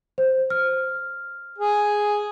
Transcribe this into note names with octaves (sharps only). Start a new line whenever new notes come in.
C5
F6
G#4